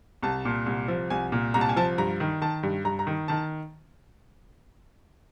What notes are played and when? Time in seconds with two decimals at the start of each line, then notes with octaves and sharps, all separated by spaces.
0.22 C2 A5
0.45 A#2
0.66 C2
0.88 F3
1.10 C2 G#5
1.32 A#2
1.54 C2 A#5
1.61 A5
1.69 G#5
1.76 F3 A5
1.98 G2 A#5
2.20 D#3
2.41 D#3 A5
2.63 G2
2.84 G2 A#5
2.99 A#5
3.07 D#3
3.28 D#3 A5